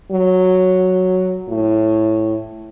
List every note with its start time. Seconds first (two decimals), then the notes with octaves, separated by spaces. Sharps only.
0.11 F#3
1.48 A2